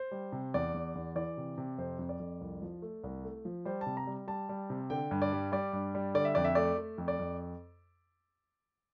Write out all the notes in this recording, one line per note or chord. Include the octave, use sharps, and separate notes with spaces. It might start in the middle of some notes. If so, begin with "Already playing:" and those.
Already playing: C5
G3
C3
E2 D5
E2
E2
E3 D5
C3
C3
F2 C5
F2
D5
F2
C2
F3
A3
C2
A3
F3
G3 C5
A5
C3
A#5
G3
G3 A5
G3
C3
D3 G5
G2
D5
G3
G3 D5
G2
G3
D3 D5
E5
F2 D5
E5
A3 D5
A3
F2
D5
F2